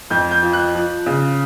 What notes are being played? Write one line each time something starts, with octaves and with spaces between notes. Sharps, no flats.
F2 G6
G6
F3
F#6
F3
C#3